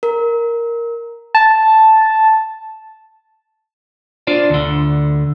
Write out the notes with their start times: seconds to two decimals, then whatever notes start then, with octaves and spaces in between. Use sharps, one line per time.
0.03 A#4
1.35 A5
4.27 D4 F4 C5 D5
4.50 D2 D3